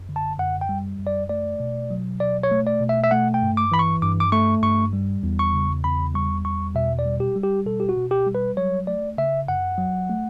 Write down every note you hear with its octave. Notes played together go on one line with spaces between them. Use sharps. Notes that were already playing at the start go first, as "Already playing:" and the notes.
Already playing: F#2
D3
A5
F#2 F#5
G5
G3
F#2
D5
A3 D5
B2
F#3
B2 D5
C#5
A3
D5
B2
E5
E5
A3 F#5
G5
G2
D6
E3 B5
C#6
G2 D6
D6
A3 C#6
G2 C#6
G3
E2
C#6
C#3
E2 B5
G3 C#6
E2 C#6
B2 E5
D5
G3
G4
G3
G4
B2 A4
G4
F#4
B2
G4
G3
B4
F#3 C#5
A3 D5
C#3 E5
F#2 F#5
F#3
A3